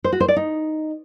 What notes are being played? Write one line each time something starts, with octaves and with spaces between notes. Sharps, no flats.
C5
F#4
C5
D5
D#4